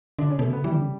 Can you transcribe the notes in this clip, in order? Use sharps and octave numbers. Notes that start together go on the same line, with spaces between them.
D3 D4
C#3 C#4
B2 A3
C#3 B3
E3 G3
D3
C#3